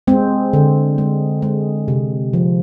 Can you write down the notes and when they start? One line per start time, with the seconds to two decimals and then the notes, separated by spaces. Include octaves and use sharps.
0.07 G#3 C4
0.53 D3
0.98 G#3
1.42 G#3
1.88 C3
2.33 F3